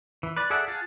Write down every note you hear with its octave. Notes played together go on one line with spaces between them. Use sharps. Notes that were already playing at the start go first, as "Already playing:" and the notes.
E3
B4 D5
G#4 A4 D5 E5 F#5
F4 G#4 F#5 A5